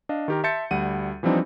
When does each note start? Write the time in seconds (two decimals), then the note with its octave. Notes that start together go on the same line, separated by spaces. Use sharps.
0.09 D4 D#5 F5
0.28 D#3 G4 A#4
0.44 E5 A5 C6 G6 A6 C#7
0.71 D2 G3 F#5 D#7
1.23 E3 F3 G3 C4 D4 D#4